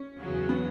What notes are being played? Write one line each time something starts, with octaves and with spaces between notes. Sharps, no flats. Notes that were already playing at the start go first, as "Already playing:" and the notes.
Already playing: C#4
E2 C#3 F#3
B3